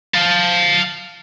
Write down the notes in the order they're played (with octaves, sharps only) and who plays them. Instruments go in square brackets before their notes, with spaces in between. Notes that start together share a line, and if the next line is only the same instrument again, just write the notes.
[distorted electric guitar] F5 A5